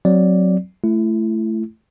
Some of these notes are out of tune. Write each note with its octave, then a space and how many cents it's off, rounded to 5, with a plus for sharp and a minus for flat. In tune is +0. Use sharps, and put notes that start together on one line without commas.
F#3 +0 C4 +0 D5 +0
A3 -5 E4 +30